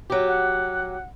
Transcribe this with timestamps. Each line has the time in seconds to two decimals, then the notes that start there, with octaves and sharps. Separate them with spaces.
0.10 F#3 G4
0.27 F#5